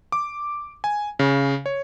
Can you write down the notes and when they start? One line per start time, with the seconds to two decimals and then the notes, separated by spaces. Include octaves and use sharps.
0.12 D6
0.84 G#5
1.19 C#3
1.66 C#5